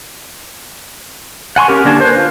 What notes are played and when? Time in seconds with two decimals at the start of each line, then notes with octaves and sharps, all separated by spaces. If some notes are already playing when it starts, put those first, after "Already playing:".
1.56 F#5 G#5 C6 C#6
1.68 C#4 G4 A#4
1.85 D3 A#3 D4 G#5 A5
2.00 B4 C5
2.17 F4